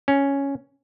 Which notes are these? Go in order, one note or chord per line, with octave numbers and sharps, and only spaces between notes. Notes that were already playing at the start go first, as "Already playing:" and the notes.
C#4